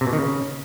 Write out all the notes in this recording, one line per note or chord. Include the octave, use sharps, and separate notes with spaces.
C3
B2
D#3
C#3